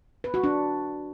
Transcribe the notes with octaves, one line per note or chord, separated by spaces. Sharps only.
B4
F#4
D4